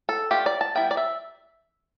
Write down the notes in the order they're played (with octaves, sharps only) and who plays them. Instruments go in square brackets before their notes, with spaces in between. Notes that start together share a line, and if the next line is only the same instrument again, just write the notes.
[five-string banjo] A4
A3 D4 F4 G4
D5
A5
G3 B3 E4 G5
D5
E5